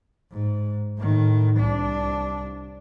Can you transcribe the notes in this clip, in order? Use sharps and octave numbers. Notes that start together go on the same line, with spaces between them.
G#2
A2 D#3
C2 D4